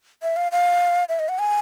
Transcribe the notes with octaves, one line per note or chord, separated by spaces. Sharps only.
E5
F5
F5
E5
D#5
F#5
G#5